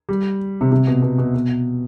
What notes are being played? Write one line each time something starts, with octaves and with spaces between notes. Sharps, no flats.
G3
C3
C3
B2
B2
B2
B2